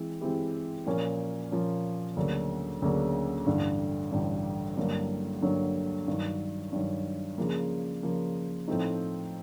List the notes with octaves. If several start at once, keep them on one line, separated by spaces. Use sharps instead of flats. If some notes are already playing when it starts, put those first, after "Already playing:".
Already playing: E3 G#3 C4
E3 G#3 C4 E4 G4
A#2 F3 A#3 C#4
A#2 F3 A#3 C#4
D2 C#3 F#3 A#3 D4
D2 C#3 F#3 A#3 D4
A1 G2 D3
A1 G2 D3
G2 D3 F#3 A#3
G2 D3 F#3 A#3
G2 D#3 F#3
G2 D#3 F#3
C#3 F3 A#3
C#3 F3 A#3
A2 F3 A3 C4 D#4